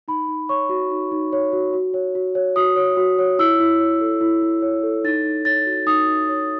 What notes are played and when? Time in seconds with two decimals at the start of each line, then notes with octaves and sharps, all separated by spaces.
0.08 D#4 B5
0.28 D#4
0.49 C#5 C#6
0.69 F#4
0.91 D#4
1.12 D#4
1.33 C#5
1.52 F#4
1.73 F#4
1.94 C#5
2.15 F#4
2.35 C#5
2.56 F#4 D#6
2.76 C#5
2.97 F#4
3.19 C#5
3.39 E4 E6
3.60 E4
3.80 C#5
4.01 A4
4.21 E4
4.42 E4
4.62 C#5
4.83 A4
5.04 D#4 A6
5.25 D#4
5.45 C#5 A6
5.66 F#4
5.86 D#4 D#6
6.07 D#4
6.29 C#5